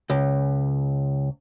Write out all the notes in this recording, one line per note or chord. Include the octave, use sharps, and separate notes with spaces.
C#2